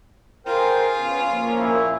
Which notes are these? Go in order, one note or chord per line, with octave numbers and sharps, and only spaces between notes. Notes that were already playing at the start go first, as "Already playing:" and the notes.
F4 G#4 A#4 C5 G5
C#3 B3 C#4
F3 A#3 C#4
A#2 E4